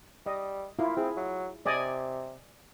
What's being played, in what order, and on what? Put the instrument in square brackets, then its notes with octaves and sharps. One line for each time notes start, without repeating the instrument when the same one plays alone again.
[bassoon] G3 [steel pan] D#5
[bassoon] A#3 [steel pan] E4 F4
[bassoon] C4 [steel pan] E4 G#4
[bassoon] F#3
[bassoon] C3 [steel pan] D5 D#5 G#5